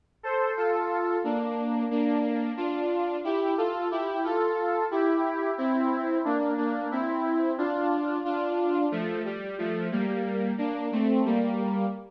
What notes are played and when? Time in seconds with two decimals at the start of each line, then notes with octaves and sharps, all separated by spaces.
0.23 A4 C5
0.57 F4 A4
1.24 A#3 D4
1.91 A#3 D4
2.57 D4 F4
3.24 E4 G4
3.58 F4 A4
3.91 E4 G4
4.24 F4 A4
4.91 E4 G4
5.58 C4 E4
6.24 A#3 D4
6.57 A#3 D4
6.91 C4 E4
7.58 D4 F4
8.25 D4 F4
8.92 F3 A3
9.25 G3
9.58 F3 A3
9.91 G3 A#3
10.58 A#3 D4
10.92 A3 C4
11.25 G3 A#3